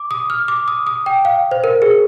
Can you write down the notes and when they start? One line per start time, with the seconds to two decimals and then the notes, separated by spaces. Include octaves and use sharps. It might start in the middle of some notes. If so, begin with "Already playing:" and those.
Already playing: D6
0.11 D#6
0.30 F6
0.48 D6
0.68 D#6
0.87 D#6
1.06 G5
1.25 F5
1.51 C5
1.64 A#4
1.82 G#4